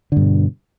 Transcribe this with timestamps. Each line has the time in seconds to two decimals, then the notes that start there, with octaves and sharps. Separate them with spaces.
0.12 D3
0.17 G2
0.21 B2